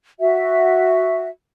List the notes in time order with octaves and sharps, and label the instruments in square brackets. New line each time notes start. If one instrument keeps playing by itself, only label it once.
[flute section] F#4 E5